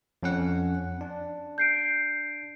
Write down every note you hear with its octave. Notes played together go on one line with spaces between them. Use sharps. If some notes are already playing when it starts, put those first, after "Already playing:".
F2 C#4 F#5
D4
G6 C7 D7